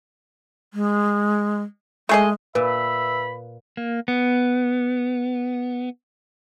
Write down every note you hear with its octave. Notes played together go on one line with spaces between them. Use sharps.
G#3
G#3 A3 G#4 D#5
A#2 B4 E5 B5
A#3
B3